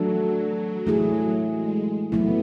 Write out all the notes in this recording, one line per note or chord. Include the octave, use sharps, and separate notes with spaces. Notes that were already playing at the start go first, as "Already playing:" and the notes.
Already playing: E3 F#3 A3 D4 F#4 A4
E3 A3 E4 G#4
G#3
F#3 A3 B3 E4